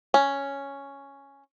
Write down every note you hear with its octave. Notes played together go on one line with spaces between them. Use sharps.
C#4